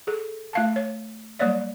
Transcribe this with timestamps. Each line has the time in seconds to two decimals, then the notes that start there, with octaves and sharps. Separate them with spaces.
0.07 G#4 A4
0.53 A3 F5 A5
0.76 C#5
1.39 F#3 G3 A#3 C#5 D5 E5